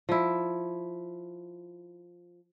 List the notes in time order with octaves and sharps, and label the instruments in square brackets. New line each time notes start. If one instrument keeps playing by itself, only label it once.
[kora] F3 E4